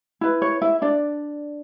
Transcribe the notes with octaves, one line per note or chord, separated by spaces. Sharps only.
E4 B4
C#5
E4 E5
D4 D5